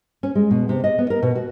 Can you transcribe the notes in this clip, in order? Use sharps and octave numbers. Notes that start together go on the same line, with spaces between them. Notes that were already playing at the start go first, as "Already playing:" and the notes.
C#4
G#3
B2
C3
D#5
B3
A#4
B2
F#4